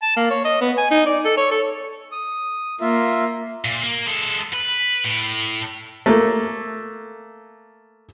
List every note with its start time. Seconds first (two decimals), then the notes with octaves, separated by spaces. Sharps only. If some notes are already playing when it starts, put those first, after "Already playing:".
0.02 A5
0.16 A#3
0.30 C#5
0.45 D#5
0.61 B3
0.78 G#5
0.91 D#4
1.06 D5
1.25 A4
1.37 C#5
1.51 A4
2.12 D#6
2.81 A#3 F4 E5
3.65 A#2
3.83 A#3
4.06 G#3 A4
4.54 B4
5.04 A2
6.06 A3 A#3